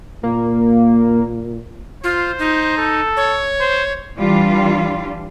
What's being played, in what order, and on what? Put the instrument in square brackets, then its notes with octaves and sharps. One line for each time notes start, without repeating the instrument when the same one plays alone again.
[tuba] A#2 [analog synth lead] A#3
[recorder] F4 [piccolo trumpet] C5
[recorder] D#4
[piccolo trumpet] A4
[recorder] C#5
[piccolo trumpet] C5
[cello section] E3 G3 D4 F4